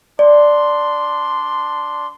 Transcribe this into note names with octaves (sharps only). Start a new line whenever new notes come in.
D4 D5 C6